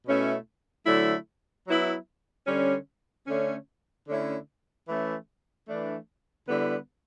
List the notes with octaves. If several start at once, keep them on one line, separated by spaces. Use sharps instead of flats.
B2 A3 C#4 E4
D3 F#3 A3 E4
F#3 B3 E4
D3 G3 C#4
D3 A3 C#4
D3 A3 C#4 E4
E3 A3 C#4
E3 A3 D4
D3 G3 B3 E4